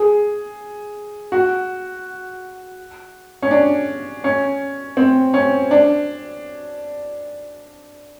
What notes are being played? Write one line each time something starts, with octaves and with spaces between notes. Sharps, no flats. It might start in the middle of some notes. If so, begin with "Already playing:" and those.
Already playing: G#4
F#4
C#4
D4
C#4
C4
C#4
D4